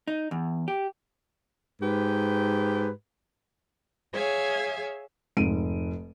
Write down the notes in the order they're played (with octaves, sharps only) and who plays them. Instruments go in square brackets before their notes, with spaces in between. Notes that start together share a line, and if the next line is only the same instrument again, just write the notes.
[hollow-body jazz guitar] D#4
E2
G4
[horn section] G#2 G4 B4
[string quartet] G#4 C#5 E5 F5 G#5
[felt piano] F1 G#2 D7 D#7